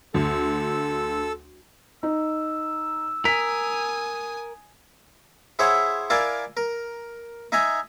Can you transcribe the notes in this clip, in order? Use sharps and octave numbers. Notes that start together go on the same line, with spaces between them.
D2 A4 E6
D#4 E6
A#4 G#5 D#6 B6
E4 G#4 C5 C#5 E5 F#5
E4 A#4 D5 F5 G#5 A5
A#4
D#4 D#5 E5 G#5 A#5